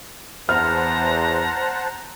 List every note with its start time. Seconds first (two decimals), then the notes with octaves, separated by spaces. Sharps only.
0.49 E2 C5 F#5 A5 A#5 F6